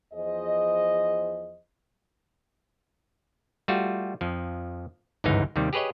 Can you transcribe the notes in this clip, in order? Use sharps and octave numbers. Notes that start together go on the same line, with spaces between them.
E2 F3 G#4 C5 D#5
G3 A3 F4 F#4
F2 F3
G1 C#2 G#2 E3 D#4 F5
D#2 C3 D#3 G3
G4 G#4 B4 C#5 D#5